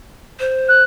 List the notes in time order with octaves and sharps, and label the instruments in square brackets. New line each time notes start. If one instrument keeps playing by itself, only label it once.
[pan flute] C5
[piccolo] F#6